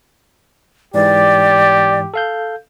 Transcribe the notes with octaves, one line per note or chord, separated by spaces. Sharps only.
G#2 E3 G#3 G4 D5
A4 F5 G6